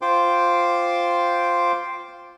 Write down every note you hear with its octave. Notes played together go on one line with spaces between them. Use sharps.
F4 C5 G5 C6 D6